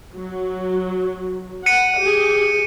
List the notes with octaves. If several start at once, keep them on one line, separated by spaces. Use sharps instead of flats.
F#3
F#5 C#7 D#7
G4 G#4